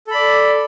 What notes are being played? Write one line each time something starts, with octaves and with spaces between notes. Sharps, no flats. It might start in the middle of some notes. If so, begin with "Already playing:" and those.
A4 D5 B5